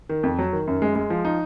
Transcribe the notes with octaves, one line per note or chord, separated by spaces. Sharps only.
D#3
F2
F#3
D#3
F#2
G#3
G#3
F3
D#4